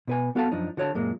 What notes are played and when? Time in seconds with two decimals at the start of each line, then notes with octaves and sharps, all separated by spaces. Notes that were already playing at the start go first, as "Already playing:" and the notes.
0.08 B2 B4 G#5
0.35 B3 F#4 A4 F5 F#5 A5
0.51 F#2 F3 D4 D#4
0.77 D3 F#4 C#5 D#5 A5
0.95 F#2 A#2 G#3 A#3